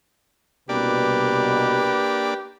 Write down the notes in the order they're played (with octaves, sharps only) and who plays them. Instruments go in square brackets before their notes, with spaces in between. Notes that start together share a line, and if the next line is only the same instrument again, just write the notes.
[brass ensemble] C2 B2 [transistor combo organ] A#3 D4 D5 [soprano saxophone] G4 [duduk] B4